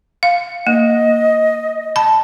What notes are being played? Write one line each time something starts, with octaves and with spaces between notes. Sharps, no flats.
F5
A#3 D#5
A5 B5